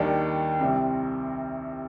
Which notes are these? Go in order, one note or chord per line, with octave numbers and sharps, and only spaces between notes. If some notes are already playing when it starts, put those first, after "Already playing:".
Already playing: D#2 D#3 G3 D4
C2 C3 G3 C4